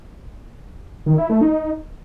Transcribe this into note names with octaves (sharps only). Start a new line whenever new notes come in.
D#3
E4
A3
D#4